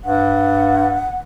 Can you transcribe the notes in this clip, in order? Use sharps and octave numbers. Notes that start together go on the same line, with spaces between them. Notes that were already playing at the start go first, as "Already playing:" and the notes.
G2 F#5